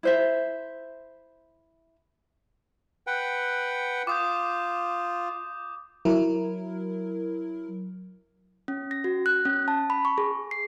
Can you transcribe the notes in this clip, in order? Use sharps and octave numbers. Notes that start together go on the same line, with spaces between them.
E4 C5 E5
B4 F#5 G5
F4 D6 D#6 G6
F#3 E4 A#4
C#4
A#6
F#4
F#6
C#4
A5
B5
C#6
G#4
C7